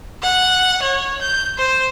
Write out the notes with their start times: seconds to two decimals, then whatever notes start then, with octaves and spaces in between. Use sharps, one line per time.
0.22 F#5
0.82 C#5
1.21 G6
1.58 C5